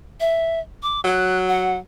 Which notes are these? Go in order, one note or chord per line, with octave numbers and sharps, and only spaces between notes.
E5
D6
F#3 F#6
F#5